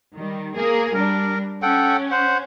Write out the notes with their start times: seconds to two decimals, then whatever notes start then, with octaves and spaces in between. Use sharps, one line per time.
0.14 D#3 G3
0.55 A#3 G#4 A#4
0.94 G3 D4 A#4
1.62 C#4 A4 F#5 G5
2.11 C5 F#5